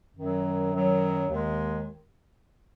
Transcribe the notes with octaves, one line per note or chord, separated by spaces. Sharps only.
F#2 D#3 F#3
F#2 D#3 F#3
D#2 D#3 G#3